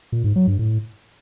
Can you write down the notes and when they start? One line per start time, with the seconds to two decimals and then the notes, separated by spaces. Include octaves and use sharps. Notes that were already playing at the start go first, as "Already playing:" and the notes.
0.12 A#2
0.24 G#2
0.36 F#3
0.47 G2
0.59 A2